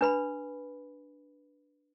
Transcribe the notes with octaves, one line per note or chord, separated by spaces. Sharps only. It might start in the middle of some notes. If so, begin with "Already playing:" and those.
D4 B4 B5